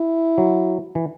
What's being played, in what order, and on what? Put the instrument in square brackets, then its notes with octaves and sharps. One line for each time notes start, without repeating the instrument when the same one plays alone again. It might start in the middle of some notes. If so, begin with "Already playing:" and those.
Already playing: [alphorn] E4
[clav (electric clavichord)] F#3
E3